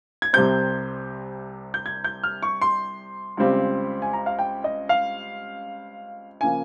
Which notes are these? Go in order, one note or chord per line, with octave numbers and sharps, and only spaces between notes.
G#6
C2 C3 G3 C4 G6
G6
G#6
G6
F6
C#6
C6
C#2 C#3 G3 C4
G#5
A#5
F5
G5
D#5
F5
C#3 F3 A#3 G#5